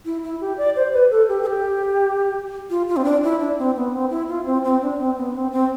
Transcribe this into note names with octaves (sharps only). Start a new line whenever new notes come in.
E4
E4
G4
D5
C5
B4
A4
G4
A4
G4
F4
F4
C4
D4
E4
D4
C4
B3
C4
E4
F4
C4
C4
D4
C4
B3
C4
C4